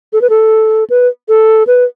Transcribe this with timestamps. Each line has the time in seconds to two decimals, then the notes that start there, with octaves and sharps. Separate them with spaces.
0.13 A4
0.21 B4
0.30 A4
0.90 B4
1.29 A4
1.67 B4